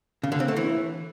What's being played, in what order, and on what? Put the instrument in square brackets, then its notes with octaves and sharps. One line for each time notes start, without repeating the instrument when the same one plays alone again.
[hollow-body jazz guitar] C#3
D3
C4
A3
E3